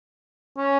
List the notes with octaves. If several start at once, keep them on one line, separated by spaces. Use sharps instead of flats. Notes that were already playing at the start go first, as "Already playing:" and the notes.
C#4